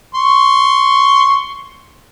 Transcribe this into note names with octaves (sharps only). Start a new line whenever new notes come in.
C6 C#6